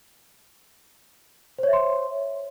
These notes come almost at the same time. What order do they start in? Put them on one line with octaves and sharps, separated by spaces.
C5 C#5 E5 C6